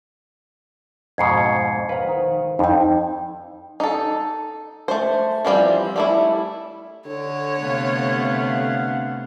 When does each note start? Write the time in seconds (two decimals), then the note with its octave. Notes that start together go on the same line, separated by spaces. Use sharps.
1.18 F2 G#2 B2 G#6 C7 C#7
1.89 B4 C5 F5 F#5 A#5
2.07 D#3
2.59 F2 D#4 G5
3.80 D#4 A4
4.88 A3 C5
5.45 E3 F3 G3 C4
5.96 G3 A3 E4
7.07 D3 C#5
7.61 C3 A3 B3 F5 F#5